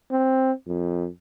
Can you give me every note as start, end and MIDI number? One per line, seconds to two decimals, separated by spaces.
0.11 0.52 60
0.67 1.08 41